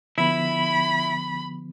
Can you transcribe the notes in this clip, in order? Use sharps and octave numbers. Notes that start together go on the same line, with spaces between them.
D3 F3 B3 E4 B5